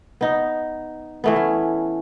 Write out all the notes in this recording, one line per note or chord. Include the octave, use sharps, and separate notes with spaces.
B3 D#4
E3 A3 B3
C#4